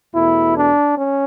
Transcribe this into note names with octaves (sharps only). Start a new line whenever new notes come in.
E2 B2 A3 E4
D4
C#4